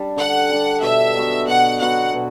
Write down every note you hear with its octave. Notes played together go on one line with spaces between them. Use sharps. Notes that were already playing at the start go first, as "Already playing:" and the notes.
Already playing: G3 D4
D3 F#5
G3 D4
B2 E5
F#3 B3 F#4
B2 F#5
F#3 B3 F#4 F#5
B2